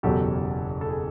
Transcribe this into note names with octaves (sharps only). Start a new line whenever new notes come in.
F#1 E2 B2 F#3 G4 A4
A4
G#4